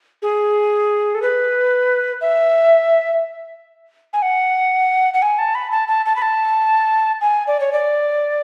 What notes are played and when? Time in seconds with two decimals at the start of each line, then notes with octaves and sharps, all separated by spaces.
0.22 G#4
1.15 A4
1.22 B4
2.21 E5
4.13 G#5
4.22 F#5
5.14 F#5
5.22 G#5
5.38 A5
5.55 B5
5.71 A5
5.88 A5
6.06 A5
6.16 B5
6.22 A5
7.21 G#5
7.47 D5
7.60 C#5
7.73 D5